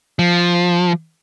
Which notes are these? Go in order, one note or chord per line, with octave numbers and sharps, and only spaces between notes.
F3